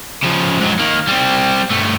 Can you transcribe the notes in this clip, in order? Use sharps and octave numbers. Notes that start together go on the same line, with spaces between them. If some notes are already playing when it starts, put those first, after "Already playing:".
C#3 F3
G#2 F#3
D#3 A#3
G3 C4
G2 A3